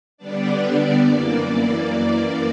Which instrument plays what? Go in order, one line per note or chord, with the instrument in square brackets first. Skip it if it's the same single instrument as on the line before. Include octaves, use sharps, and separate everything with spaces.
[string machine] D3 G3 B3 D4 D5
F#2 E3 A#3